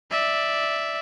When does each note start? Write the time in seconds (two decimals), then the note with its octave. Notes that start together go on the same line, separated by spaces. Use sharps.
0.11 D5 E5